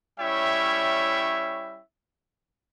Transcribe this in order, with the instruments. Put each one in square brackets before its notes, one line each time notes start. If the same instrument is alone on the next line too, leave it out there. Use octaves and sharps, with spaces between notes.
[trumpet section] G3 C#4 E4 C#5 E5 G5